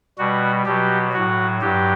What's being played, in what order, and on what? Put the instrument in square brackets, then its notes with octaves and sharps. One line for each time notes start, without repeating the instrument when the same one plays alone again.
[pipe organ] B2 G3 F#4
B2 F#3 G4
A2 F#3 F#4
G2 F#3 G4